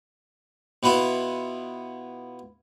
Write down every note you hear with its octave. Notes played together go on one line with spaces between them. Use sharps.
B2 B3 E4 F4